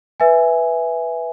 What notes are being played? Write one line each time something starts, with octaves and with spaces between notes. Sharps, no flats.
B4 E5 G#5